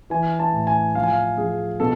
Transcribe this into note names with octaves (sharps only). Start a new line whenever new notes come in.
E3 G#5
A5
A2
G#5
F3 F5
G#5
F5
F3 G#4
B2 A4